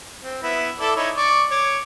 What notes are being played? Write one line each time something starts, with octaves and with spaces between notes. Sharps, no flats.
C4
B3 E4 E5
E4 A4 D5
D#4 E4 C#5
D5 C#6
C#5 D6